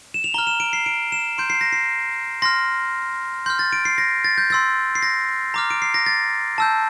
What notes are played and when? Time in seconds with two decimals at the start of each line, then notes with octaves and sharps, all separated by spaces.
0.14 E7
0.24 F7
0.34 A#5 F6 G7
0.47 E7
0.60 D7
0.73 C7
0.86 D7
1.12 E7
1.38 C6 G6 D7
1.50 C7
1.61 A#6
1.72 C7
2.42 C6 F6 A#6
3.46 C6 F6 G6
3.59 A6
3.73 D7
3.85 C7
3.98 A#6
4.24 A6
4.38 G6
4.50 C6 E6 G6 A6
4.95 C7
5.02 A#6
5.54 A#5 D6 F6
5.70 D7
5.82 C7
5.94 A#6
6.06 A6
6.58 A5 E6 G6